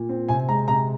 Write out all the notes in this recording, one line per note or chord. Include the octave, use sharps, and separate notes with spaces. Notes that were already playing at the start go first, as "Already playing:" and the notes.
Already playing: A#2
C4
C3 G#5
G#3 A#5
C3 A#5